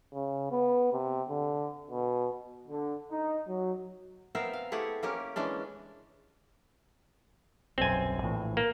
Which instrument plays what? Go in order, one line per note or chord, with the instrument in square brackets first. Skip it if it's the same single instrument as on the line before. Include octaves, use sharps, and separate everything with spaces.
[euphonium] C#3
B3
C3
D3
B2
[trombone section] D3
D#4
F#3
[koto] B3 C4 A#4 C5 E5 F5
F5
A3 E4 G4 G#4 F#5
A#3 C#4 G4 A#4
E3 G#3 C#4 D4
[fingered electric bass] D#1 B1 F#2 [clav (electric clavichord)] C4 G#5
[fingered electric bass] A#1 A2 E3
[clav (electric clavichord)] A#3